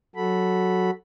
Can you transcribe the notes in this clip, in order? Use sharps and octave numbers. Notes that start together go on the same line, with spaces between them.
F#3 F#4 A4 B5